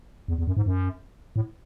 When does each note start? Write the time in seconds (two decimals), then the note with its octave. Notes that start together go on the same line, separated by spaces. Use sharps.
0.28 E2
0.38 E2
0.47 F#2
0.57 G#2
0.66 F#2
1.36 A2